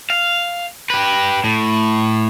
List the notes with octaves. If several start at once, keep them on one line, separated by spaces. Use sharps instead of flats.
F5
G4 B4
A2